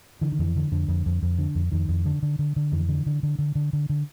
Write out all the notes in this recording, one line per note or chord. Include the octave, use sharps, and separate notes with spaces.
D3 E3
D#3
F2 E3
D3
F2 D3
F2
F2
F2
D3
F2
F2 D#3
F2
D3
D3
D3
D3
F2 E3
D3
D3
D3
D3
D3
D3
D3